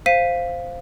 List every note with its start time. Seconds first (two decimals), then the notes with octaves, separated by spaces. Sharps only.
0.06 C5 F5 B6 D#7